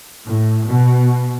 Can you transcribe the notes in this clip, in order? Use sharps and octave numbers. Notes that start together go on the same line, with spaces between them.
A2
B2